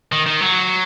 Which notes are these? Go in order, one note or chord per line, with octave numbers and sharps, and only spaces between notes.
D#3
D#3
F#3